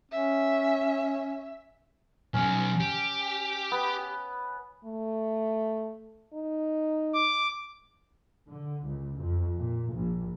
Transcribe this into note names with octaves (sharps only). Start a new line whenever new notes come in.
C#4 E5
B1 F#3 C#4
G4
B3
A3
D#4
D6
D3
C#2
F2
A#2
A#1